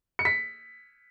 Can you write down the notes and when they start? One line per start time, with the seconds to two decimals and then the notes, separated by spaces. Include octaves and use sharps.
0.19 C#7
0.25 B6